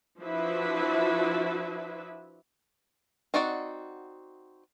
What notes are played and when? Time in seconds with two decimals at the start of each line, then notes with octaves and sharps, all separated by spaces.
0.20 F3 D4 E4 F#4 B4 E5
3.34 C4 D#4 F#4 D5 F#5